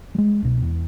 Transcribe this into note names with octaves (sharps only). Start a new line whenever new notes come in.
G3 G#3
C2 B2
E2